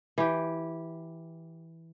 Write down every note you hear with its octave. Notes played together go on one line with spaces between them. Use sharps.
E3 G4